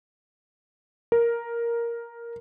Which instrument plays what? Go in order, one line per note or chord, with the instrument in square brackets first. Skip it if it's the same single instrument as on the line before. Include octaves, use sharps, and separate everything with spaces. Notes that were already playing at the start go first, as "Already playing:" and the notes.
[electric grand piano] A#4